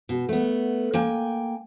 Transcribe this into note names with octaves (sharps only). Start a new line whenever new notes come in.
B2
A3 B3
A#3 G5 G#5